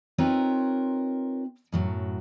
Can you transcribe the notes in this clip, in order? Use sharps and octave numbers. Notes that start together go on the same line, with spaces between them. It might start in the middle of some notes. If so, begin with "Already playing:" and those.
C4 D#4 F4 A#4 B4 C#5
F#2 A2 F#3